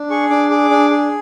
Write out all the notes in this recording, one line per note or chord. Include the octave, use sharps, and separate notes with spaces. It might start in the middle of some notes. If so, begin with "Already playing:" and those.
Already playing: D4
G#4 C#6
D4 D6
G#4 D6
D4
G#4